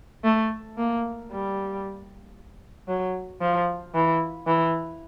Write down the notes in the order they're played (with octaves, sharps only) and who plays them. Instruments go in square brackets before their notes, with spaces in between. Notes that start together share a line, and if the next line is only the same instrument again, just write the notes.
[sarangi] A3
A#3
G3
F#3
F3
E3
E3